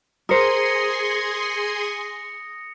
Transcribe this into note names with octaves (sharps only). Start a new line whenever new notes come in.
G#4 A#4 C5 G#5 C6 D#6 A#6 C#7